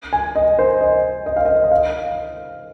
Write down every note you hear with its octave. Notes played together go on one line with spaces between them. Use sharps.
G#5
D#5
C5
D#5
D#5
F5
D#5
D#5
F5